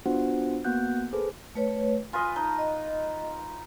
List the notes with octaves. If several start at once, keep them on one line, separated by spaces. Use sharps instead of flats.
B3 D4 F4 F#4 C5 F#5
A#3 B3 F#4 F#5 F#6 G6
G#4 A4 B4 C5
A3 B4 C#5
F4 B4 D#5 G#5
D#4 A5
D#5